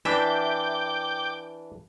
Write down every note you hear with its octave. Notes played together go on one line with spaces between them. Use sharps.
E3 D4 E5 G5 D6